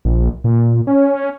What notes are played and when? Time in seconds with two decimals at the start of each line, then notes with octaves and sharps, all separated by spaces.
0.05 A#1
0.44 A#2
0.87 C#4
1.15 C#4